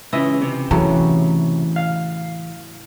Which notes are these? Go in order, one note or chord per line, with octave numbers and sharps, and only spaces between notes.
C#2 C#3 E3 D#5 E5
C3
A2 C#3 E3 F#3
F5